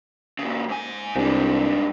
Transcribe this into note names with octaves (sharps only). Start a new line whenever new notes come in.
A#2 C#3
G#2 G#5
C2 G#2 D4